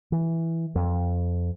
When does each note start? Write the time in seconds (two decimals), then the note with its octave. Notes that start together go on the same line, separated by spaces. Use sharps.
0.12 E3
0.75 F2